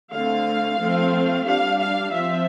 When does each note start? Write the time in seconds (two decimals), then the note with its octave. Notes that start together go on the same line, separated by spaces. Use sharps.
0.12 D3 A3 C4 F5
0.79 F3 A3 C4
1.46 G3 D4 F5
1.79 F5
2.13 F3 C4 E5